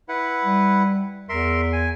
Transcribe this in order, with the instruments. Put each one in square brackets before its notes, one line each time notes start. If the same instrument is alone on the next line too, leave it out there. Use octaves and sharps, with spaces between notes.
[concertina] E4 B4 F#5
[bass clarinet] G3
[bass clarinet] E2 [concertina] A#4 E5 C6
[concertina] G#5